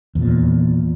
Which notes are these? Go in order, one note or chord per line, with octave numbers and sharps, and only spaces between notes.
E2 A#2